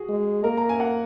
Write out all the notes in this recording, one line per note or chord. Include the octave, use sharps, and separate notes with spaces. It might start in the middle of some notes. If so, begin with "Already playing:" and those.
Already playing: F#4 G#4
G#3
A#3 A#4
A#5
G#5
F#5